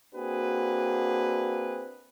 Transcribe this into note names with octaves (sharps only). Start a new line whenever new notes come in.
A#3 C4 D4 F#4 G#4 B4